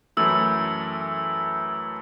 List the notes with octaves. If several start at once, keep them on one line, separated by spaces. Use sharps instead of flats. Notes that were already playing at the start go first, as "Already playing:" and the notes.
F#2 E3 A3 E4 E6